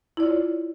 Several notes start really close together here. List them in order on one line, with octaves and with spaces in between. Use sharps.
E4 D5 F4 C#5